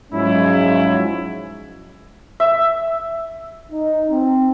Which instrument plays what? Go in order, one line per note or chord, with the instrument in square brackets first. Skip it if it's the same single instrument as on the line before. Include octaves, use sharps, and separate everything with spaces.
[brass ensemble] G#2 F3 F#3 G#3 C#4 E4
[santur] E5
[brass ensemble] D#4
C4